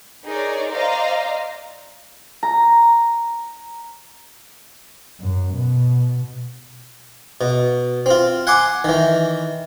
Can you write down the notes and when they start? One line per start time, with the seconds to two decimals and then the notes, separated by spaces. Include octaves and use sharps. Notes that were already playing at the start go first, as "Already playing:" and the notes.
0.25 D#4 G#4 A#4 C#5 D5
0.71 C5 D5 D#5 F5 A#5
2.43 A#5
5.20 F#2
5.54 B2
7.41 B2
8.06 C4 F4
8.47 F#5 G#5 C6 D6
8.84 D#3 E3